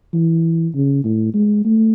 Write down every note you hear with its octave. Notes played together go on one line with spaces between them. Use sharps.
E3
C#3
A2
G#3
A3